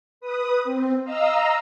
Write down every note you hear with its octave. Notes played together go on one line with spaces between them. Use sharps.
B4 D#6
C4
D#5 F5 A#5 E6